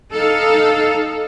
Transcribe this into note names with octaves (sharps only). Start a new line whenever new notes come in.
D#4 A4 F5